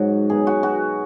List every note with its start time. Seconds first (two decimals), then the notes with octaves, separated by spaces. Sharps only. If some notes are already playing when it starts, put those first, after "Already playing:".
Already playing: G#2 F#3 F#4
0.30 B2 F#3 G#4
0.47 F#4
0.63 F#4